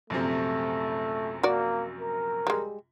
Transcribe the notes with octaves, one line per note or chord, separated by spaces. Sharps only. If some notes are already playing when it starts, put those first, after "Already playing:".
A#1 F#2 C3 A3
A#3 F#4 D5
A#4
G3 G#3